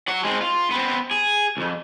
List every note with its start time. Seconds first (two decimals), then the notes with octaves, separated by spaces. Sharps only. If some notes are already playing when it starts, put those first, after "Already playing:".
0.08 F#3 F#5
0.25 G#3 C4
0.41 F4
0.71 B3 C4
1.11 G#4
1.57 C2 F2